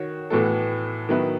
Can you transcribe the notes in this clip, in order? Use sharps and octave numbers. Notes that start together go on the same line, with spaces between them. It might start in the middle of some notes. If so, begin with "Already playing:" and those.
Already playing: D#3 F#4 C#5
A2 E3 B3 F#4 A4
D#3 F#3 B3 E4 B4